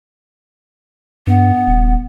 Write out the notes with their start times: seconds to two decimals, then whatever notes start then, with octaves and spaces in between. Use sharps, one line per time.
1.27 G2 B3
1.67 D#1